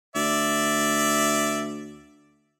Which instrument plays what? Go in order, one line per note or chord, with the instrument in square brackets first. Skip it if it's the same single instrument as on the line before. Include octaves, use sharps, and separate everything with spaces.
[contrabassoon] D2 [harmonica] D5 E5